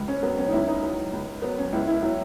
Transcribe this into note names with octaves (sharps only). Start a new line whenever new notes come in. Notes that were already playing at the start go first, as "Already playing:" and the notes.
Already playing: C#2
C#4
F#3 B3
C#4
D#4
C#2 E4
D#4
F#3
C#2
F#3 B3
C#4
C#2 E4
E4
F#3 E4